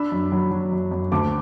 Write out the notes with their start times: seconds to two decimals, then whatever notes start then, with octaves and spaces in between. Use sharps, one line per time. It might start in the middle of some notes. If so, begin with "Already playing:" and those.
Already playing: D4 B5 E6
0.12 F#2
0.32 F#3
0.51 F#3
0.72 F#2
0.91 F#2
1.12 D2 A5 D6